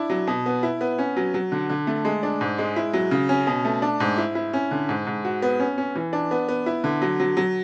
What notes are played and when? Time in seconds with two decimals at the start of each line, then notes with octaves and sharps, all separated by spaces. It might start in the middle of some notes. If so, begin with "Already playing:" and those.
Already playing: D4 E4
0.10 F#3
0.27 B2
0.46 B3
0.63 E4
0.81 B3
0.99 C#4
1.17 F#3
1.34 F#3
1.52 D3
1.69 D3
1.87 A3
2.05 G#3
2.23 D4
2.41 G#2
2.58 G#3
2.76 E4
2.93 F#3
3.11 C#3
3.29 C#4
3.47 B2
3.65 A3
3.82 D4
4.00 G#2
4.18 E4
4.35 E4
4.53 C#4
4.71 D3
4.89 G#2
5.07 G#2
5.25 F#4
5.42 B3
5.60 C#4
5.78 C#4
5.95 E3
6.13 D4
6.31 B3
6.48 B3
6.66 E4
6.84 D3
7.02 F#3
7.20 F#3
7.37 F#3